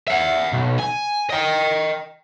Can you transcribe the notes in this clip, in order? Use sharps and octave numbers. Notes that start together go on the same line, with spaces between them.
E5 F#5
B1
G#5
D#5 G5